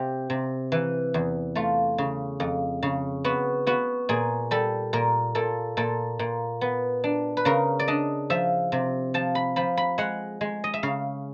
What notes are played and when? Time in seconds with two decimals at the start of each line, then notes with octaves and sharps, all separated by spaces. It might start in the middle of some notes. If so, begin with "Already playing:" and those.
Already playing: C3 G4
0.30 C3
0.72 E3
1.14 E2
1.55 A3 F4
1.98 C#3
2.40 F2
2.83 C#3
3.24 B3 F#4
3.67 B3 F#4
4.09 A#2 G#4
4.51 G3 A4
4.93 A#2 A#4
5.35 A#2 A4
5.77 A#2 A4
6.19 A#2
6.61 B3
7.04 D4
7.37 B4
7.45 C#3 A#4
7.79 D5
7.88 D4 D#5
8.30 F3 E5
8.72 C3
9.14 F3 A5
9.35 B5
9.56 F3 B5
9.77 B5
9.98 G#3 F#5
10.41 G#3
10.64 D#5
10.74 E5
10.83 C#3 F5